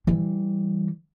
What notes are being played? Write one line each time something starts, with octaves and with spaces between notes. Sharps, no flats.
E3 G3